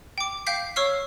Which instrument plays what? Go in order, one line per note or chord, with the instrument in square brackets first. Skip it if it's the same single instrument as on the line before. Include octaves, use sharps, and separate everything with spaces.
[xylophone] G5 D6
F5 G5 G6 B6 C7
C#5 C#6 E6 F6 C7